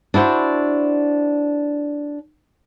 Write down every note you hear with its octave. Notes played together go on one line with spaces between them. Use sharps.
D4 E4 F#4 C5